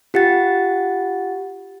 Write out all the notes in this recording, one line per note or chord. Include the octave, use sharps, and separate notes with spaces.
F4 G4 F#5 A6